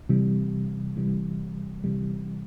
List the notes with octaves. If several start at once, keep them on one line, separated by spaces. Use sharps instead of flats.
C3 E3 G3
C3 E3 G3
C3 E3 G3